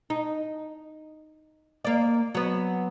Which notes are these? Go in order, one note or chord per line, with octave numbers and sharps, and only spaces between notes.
D#4
A#3 D5
F#3 B3